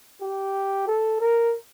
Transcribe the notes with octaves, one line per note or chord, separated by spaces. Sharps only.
G4
A4
A#4